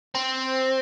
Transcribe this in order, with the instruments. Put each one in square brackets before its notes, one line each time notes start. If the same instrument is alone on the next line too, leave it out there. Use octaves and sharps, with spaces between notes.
[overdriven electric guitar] C4